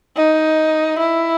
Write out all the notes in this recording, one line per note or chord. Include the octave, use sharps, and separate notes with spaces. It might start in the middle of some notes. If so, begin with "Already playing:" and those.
D#4
E4